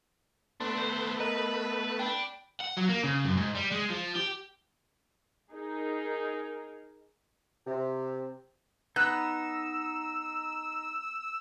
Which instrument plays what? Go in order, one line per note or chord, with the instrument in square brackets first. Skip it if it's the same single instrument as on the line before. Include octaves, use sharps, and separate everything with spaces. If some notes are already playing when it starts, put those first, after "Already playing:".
[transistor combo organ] A3 B3 [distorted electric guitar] D4 [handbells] C6
[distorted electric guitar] D#3 C5
[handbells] A#4 D#5 A#5 [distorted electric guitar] B4
[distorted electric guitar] D4 [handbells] G5 B5
[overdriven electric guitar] F#5
F#3
A#3
C#3
F#2
G#2
G3
G#3
F3
G4
[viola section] D#4 G#4 A#4
[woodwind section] C3
[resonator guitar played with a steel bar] B3 [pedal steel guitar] D#4 [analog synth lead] E6 [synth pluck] F#6